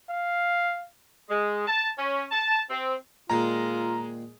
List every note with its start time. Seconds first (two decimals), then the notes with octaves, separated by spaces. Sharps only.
0.10 F5
1.29 G#3
1.67 A5
1.98 C#4
2.31 A5
2.70 C4
3.30 A#2 D#3 G#3 F4 A#5 C6